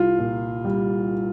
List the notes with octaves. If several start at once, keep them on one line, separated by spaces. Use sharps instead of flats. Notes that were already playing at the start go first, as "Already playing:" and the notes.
Already playing: C2 F4
A#2
G3